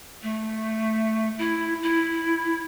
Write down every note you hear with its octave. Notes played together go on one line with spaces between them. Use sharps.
A3
E4
E4